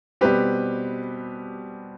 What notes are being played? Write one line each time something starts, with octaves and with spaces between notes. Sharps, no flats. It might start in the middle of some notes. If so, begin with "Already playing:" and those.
B2 G3 C4 G4 B4